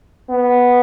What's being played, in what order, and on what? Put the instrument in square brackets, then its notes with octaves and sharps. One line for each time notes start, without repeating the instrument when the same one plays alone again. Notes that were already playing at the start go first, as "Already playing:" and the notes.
[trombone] B3